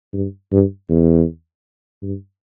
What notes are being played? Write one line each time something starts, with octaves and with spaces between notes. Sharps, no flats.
G2
G2
E2
G2